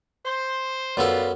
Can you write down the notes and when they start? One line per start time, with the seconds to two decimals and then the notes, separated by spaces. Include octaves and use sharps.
0.24 C5
0.97 F#2 G3 B3 F4 A4